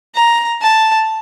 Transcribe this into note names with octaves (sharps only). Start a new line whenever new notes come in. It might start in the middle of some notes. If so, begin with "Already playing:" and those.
A#5
A5